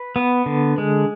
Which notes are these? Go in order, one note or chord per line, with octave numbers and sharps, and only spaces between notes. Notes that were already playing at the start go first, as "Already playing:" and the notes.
Already playing: B4
B3
D3
G#3